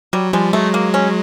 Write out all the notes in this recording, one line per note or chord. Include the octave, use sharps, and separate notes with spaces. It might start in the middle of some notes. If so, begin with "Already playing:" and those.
F#3 G3
F3 G3 G#3
F#3 G#3 A3
A#3
C#4